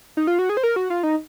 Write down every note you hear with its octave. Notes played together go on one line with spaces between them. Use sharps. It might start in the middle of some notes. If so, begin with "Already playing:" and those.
D#4
F4
F#4
G#4
C5
A#4
F#4
F4
D#4